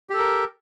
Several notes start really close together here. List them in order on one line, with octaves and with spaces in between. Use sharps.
G4 A4 A#4